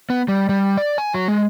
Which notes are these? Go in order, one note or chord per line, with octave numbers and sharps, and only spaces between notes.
B3
G3
G3
D5
G#5
F#3
G#3